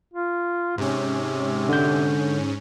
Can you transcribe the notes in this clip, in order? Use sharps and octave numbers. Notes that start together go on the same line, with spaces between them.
F4
G#2 C3 C#4
D3 G6